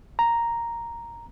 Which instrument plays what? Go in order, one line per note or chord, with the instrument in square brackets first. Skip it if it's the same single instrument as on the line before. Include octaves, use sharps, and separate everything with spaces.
[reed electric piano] A#5